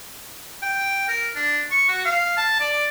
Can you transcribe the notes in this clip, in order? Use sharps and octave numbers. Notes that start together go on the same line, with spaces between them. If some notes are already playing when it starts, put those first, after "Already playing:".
G5
A#4
D4
C#6
F#4
F5
A5
D5